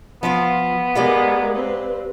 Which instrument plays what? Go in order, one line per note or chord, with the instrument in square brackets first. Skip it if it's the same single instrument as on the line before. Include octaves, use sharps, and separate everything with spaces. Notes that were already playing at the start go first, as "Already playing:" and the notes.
[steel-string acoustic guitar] F3 F4 F5 [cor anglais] B3
[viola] G#3 A#4 [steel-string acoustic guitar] G4 D5 F5
[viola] C4 B4